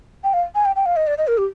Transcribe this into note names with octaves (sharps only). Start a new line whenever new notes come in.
G5
F5
G#5
G5
G5
F5
D#5
D5
D#5
A#4
G4